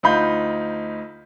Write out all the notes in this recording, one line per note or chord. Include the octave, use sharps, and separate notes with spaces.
D2 D#4 F4 B5 G6